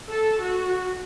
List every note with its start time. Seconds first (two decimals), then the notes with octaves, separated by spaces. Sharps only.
0.10 A4
0.43 F#4